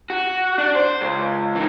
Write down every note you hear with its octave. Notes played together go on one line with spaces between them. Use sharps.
F#4
D4
C5
C#2
E3 D#4